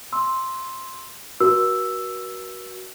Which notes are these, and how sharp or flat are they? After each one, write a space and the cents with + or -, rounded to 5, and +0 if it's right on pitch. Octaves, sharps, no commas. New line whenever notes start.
C6 +0 E6 -10
F#4 +10 A#4 +45 E6 +0